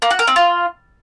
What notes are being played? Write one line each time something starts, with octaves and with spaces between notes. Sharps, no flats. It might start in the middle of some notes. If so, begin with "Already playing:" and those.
A#3
F#4
A#4
C4
F4